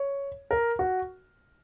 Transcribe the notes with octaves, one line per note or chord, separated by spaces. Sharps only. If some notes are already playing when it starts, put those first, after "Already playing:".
Already playing: C#5
A#4
F#4